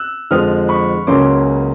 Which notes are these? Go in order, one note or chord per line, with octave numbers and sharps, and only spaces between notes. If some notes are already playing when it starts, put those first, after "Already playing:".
Already playing: E6 F#6
F2 D3 F3 G#3 D#6 F6
B5 C#6
C#2 C#3 F#3 A#3 C#4 C6 D6